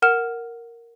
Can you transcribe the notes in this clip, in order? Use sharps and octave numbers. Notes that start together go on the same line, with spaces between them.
A#4 F#5 F6 E7